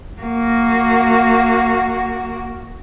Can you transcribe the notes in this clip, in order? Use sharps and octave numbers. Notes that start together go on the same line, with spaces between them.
A#3 F#4